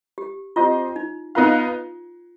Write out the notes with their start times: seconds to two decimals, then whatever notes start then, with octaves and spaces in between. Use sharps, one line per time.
0.18 G4
0.56 C4 F4 G4 C5 D#5
0.96 D#4
1.35 B3 D#4 F4 B4 F5